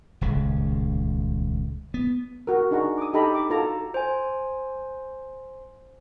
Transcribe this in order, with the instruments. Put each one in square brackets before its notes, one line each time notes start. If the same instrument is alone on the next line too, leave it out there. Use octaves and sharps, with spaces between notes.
[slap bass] D#1 C#2 C#3
B3
[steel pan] F#4 A#4
D4 D#4 G#4 F#5 A#5 C#6
D6 D#6
D#4 G4 A4 D#5 A#5 B5
D6
F4 F#4 A4 A#5
[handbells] C5 G#5